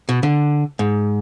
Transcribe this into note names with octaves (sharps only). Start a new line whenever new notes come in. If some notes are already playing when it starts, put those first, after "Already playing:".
B2
D3
G#2